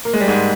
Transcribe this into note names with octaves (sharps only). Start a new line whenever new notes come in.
A#3
G#3
G3
G#2 G#3